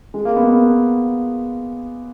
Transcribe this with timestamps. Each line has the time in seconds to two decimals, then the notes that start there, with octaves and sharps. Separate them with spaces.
0.14 G#3
0.25 A#3
0.36 B3